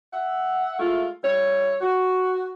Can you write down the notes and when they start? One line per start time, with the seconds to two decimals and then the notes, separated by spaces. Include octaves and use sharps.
0.13 E5 F#5
0.79 G#3 A3 E4 F4
1.24 G3 E4 C#5
1.81 F#4